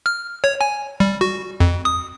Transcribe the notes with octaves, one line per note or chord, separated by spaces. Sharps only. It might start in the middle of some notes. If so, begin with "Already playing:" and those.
F6
C#5
G#5
G3
F#4
F2
D#6